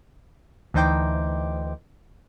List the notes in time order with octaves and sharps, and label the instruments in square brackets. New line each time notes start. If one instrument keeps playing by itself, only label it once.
[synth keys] D2 E3 D#4 C5 G5 D6